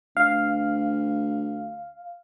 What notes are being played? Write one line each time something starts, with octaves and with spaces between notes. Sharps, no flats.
D2 F5